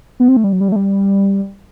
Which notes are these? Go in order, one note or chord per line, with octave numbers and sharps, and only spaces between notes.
B3
C4
A3
G3
F#3
G3
F#3
A3
G3